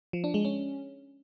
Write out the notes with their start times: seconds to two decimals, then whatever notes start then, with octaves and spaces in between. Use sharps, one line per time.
0.13 F3
0.24 D4
0.34 G#3
0.45 C#4